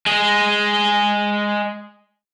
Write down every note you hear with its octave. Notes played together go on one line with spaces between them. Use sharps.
G#3 G#4